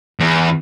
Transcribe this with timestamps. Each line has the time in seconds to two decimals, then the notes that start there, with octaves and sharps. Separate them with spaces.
0.20 E2